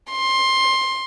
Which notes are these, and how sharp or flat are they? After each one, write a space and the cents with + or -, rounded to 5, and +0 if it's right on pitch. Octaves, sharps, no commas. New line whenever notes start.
C6 +15